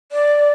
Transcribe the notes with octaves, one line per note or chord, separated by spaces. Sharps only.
D5